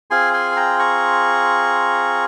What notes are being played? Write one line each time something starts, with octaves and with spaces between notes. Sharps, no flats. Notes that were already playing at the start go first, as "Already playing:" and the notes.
C4 F4 G#4 G#5 C6
G#5 C6
C6
G5 A#5
A#5 C#6